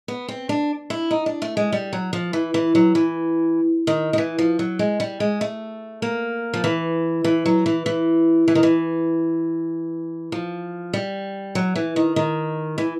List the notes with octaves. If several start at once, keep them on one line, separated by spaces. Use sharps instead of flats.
B3
C4
D4
E4
D#4
D4
A3
G#3
G3
F#3
F3
E3
E3
F#3
E3
D#3
D#3
E3
F3
F#3
G#3
G3
G#3
A3
A#3
F3
E3
E3
F#3
E3
E3
E3
D#3
E3
F3
G3
F#3
E3
D#3
D#3
E3